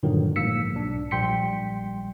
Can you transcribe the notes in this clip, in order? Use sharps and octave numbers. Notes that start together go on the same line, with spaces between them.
G2 A#2 D3 D#3 F#3
A#1 G#2 A#3 E6 B6 C#7
B1 D4
A#1 G3 G5 C6 B6 C#7